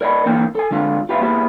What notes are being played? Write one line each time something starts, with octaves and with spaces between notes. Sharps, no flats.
A#4 D5 D#5 F#5 B5
D3 E3 A#3 G5
A4 G#5
D3 G#3 D4 F4
F4 G4 B4 E5 F5
A#3 B3 E4 G4 G#4